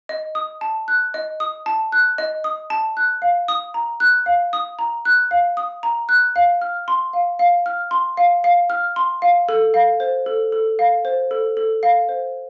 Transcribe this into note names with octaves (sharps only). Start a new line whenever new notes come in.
D#5
D#6
A5
F#6
D#5
D#6
A5
F#6
D#5
D#6
A5
F#6
F5
D#6
A#5
F#6
F5
D#6
A#5
F#6
F5
D#6
A#5
F#6
F5
F6
C6
F5
F5
F6
C6
F5
F5
F6
C6
F5
A4
F5
C5
A4
A4
F5
C5
A4
A4
F5
C5